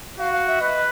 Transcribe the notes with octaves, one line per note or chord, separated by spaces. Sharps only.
F#4 F5
F5
E5
B4 D#5